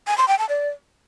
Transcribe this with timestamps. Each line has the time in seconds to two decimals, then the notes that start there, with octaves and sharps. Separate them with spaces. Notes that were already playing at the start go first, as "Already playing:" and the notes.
0.07 G#5
0.18 C6
0.28 G5
0.39 A5
0.49 D5